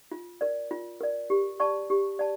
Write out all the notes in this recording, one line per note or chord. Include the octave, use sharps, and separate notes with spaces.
F4
A#4 D5
F4
A#4 D5
G4
D5 A5 C#6
G4
D5 A5